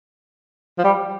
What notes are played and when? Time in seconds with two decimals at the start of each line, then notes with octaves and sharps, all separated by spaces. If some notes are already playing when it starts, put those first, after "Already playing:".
0.78 F3
0.84 G3